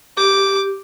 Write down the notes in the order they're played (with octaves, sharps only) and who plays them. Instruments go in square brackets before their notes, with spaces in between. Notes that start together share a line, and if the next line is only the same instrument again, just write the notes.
[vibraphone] G4 [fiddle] D6